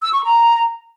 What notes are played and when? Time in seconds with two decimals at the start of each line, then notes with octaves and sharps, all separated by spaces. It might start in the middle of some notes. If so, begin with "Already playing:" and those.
0.02 E6
0.13 C#6
0.24 A#5